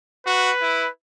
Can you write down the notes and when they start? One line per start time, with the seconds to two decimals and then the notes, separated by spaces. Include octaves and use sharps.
0.26 F#4 B4
0.62 E4